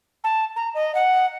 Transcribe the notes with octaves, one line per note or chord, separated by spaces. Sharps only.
A5
A#5
D#5
F#5